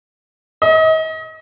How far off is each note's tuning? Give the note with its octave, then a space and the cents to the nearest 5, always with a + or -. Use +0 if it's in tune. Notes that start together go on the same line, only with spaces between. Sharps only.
D#5 +35